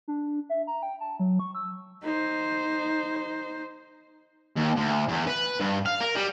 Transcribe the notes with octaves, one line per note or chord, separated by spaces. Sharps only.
D4
E5
A#5
G5
A5
F#3
C#6
E6
D#4 C5
D#2
D2
E2
B4
G2
F5
A#4
G3